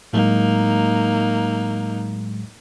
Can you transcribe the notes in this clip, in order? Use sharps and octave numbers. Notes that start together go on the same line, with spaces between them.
A2 F#3 G#3 A#3 D#4